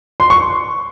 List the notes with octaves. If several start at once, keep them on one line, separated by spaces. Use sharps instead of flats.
C6
C#6